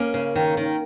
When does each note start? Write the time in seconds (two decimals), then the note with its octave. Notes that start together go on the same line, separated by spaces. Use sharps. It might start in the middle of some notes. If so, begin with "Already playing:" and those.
Already playing: A#3 C#4
0.14 C#3
0.35 D#3
0.57 D#3